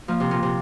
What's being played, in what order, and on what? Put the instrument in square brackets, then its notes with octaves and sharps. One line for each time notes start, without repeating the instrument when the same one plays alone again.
[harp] F3 A#3
C3
A#2
C3